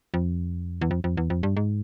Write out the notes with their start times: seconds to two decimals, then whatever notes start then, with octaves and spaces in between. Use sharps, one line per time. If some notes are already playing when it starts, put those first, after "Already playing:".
0.14 F2
0.81 E2
0.91 F2
1.04 F2
1.17 E2
1.30 F2
1.43 G2
1.57 G#2